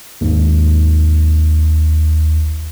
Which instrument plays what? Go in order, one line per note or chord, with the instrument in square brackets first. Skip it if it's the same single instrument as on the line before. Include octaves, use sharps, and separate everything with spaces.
[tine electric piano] G#1 D#2